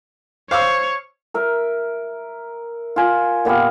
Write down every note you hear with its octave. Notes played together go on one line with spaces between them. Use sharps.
C5 C#5 F5 D6 E6
A#4 E5
F4 G#5
A#2 B3 G4 F5